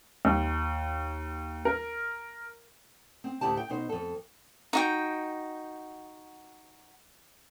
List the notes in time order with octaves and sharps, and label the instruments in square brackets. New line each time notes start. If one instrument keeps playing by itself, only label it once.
[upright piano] D#2
A#4
[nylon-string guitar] C4
D2 A2 E4 G4 A5
G5
B2 D#4 C5
F2 A4
[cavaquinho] D#4 F#4 G5